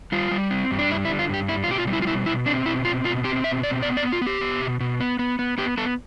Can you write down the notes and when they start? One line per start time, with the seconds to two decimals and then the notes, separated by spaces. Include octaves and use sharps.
0.12 G3 F4
0.31 G3
0.51 C4
0.71 G2
0.79 D4
0.90 G3 E4
1.05 E4
1.10 D3
1.19 F4
1.29 G2 G4
1.48 G3 E4
1.64 F4
1.68 B2 G4
1.78 F4
1.87 G3
1.93 E4
2.02 F4
2.07 B2 E4
2.26 B2 E4
2.46 C4 D4
2.65 B2 E4
2.85 C4 F4
3.04 B2 F4
3.24 C4 G4
3.44 B2 E5
3.63 C4 D5
3.82 B3 D5
3.97 D5
4.03 B3
4.12 F4
4.22 B3 G4
4.41 B3
4.61 B2
4.80 B2
5.00 B3
5.19 B3
5.39 B3
5.58 B3 G4
5.77 B3 A4